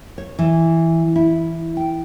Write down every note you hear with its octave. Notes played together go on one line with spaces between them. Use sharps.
C#5
E3
E4
G5